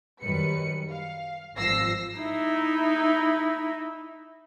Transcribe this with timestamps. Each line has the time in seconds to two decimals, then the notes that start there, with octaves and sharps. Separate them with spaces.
0.21 F#2 D#3 G3 B4 C#7
0.90 F5
1.55 G#1 G2 F3 E6 A#6 C7
2.18 D#4 E4